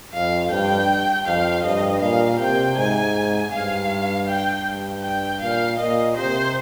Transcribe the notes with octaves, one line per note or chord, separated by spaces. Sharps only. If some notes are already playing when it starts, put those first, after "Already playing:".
F2 F5
G2 G5
F2 F5
G2 D#5
A#2 F5
C3 G5
G#2 G#5
G2 F5
G5
G2
G5
A#2 F5
A#2 D#5
C3 C5